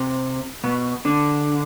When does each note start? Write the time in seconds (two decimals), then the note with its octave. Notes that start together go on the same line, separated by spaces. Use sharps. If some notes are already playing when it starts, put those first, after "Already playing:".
Already playing: C3 C4
0.64 B2 B3
1.05 D3 D4